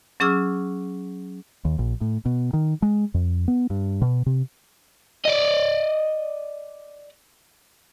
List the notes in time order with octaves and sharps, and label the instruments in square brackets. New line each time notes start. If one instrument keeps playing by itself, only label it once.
[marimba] F#3 C#4 G#4 D6 E6 F6
[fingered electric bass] D#2
A#1
A2
B2
D#3
G#3
F2
B3
G2
B2
C3
[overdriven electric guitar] D5 D#5